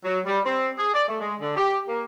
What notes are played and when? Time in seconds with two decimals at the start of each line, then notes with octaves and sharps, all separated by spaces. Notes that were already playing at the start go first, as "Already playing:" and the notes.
0.04 F#3
0.26 G3
0.46 C4
0.77 G#4
0.94 D5
1.08 A3
1.19 G#3
1.40 D3
1.56 G4
1.88 A#3